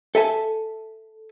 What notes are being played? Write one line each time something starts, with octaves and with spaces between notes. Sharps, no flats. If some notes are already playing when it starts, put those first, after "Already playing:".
A4 E5 G#5 A5